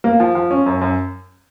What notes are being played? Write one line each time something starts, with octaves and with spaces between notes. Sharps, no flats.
A#3
F3
F3
C#4
F#2
F#2